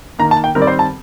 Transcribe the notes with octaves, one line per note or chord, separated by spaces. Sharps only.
D#3 A#3 A#5
A5
G5
D#3 G3 C4 A#4
D5
C5
A5